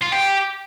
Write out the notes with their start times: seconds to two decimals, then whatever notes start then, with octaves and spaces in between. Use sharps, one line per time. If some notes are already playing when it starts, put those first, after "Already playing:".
0.02 F4
0.11 G4 G5